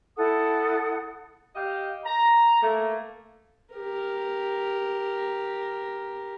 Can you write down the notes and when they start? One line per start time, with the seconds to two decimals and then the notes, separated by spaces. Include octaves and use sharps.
0.17 E4 A4 F#5 D#6
1.55 G4 D#5 F5
2.05 A#5
2.62 A3 A#3
3.75 G4 A#4